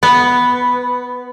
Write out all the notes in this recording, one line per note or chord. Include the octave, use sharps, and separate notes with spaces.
B3